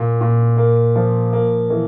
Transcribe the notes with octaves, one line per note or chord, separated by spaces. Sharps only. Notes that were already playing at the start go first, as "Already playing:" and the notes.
Already playing: A#2 A#3
A#2
A#3
F3
A#3
E3